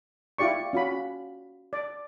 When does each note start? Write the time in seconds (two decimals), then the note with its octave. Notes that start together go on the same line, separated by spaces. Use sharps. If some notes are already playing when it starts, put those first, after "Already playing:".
0.38 E4 F4 G4 D5 C#6
0.73 C#4 F4 F#4 B5
1.73 D5